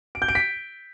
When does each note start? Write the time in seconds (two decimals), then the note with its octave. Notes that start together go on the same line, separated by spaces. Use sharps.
0.15 D7
0.22 G6
0.28 D7
0.35 B6